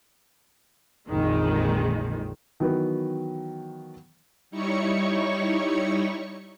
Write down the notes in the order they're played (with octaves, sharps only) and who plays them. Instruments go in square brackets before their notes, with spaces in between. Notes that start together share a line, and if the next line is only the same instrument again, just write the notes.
[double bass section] A#1 F2 D3 [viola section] D#3 G#3
[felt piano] D#3 E3 F#3 B3
[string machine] G3 D#4 E4 C#5 C#6 C#7